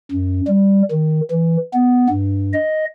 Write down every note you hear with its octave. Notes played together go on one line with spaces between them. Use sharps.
F#2
G3
D#3
E3
B3
G2
D#5